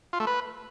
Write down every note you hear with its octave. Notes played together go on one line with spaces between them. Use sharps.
F4
A3
B4